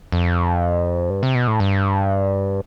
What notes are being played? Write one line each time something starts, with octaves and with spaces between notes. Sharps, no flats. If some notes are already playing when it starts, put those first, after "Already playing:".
F2
G2
C3
B2
A2
G2